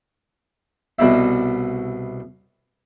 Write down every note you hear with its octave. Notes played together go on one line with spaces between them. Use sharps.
C2 B2 E4 E5